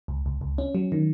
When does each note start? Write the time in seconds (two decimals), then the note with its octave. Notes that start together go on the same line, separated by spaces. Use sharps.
0.08 C#2
0.26 C#2
0.41 C#2
0.58 C#4
0.75 F#3
0.92 D#3